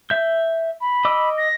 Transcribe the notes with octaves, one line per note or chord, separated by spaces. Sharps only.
E5 G6
B5
D#5 D6 E6
A#6